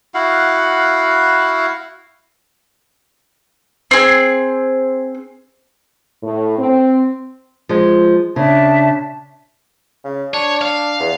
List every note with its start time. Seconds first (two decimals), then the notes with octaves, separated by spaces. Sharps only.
0.14 E4 F#4 F5 F#5
3.91 C4 G#4
6.22 A2
6.58 C4
7.69 F3 G#3
8.36 C#3 D4 E5 A5
10.04 C#3
10.34 D4 C#5
10.62 F5
11.00 E2